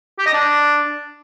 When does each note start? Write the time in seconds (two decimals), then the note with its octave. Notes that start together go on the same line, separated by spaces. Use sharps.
0.19 G4
0.26 D#5
0.34 D4